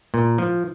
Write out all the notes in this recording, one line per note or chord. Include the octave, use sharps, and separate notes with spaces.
A#2
F3